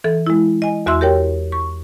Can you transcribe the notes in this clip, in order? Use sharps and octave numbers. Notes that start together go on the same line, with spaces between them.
E3 A4
G#3 E4
D#5 G#5
E2 F#4 E5 C6 E6
G4 A#4 C#5 G5
C#6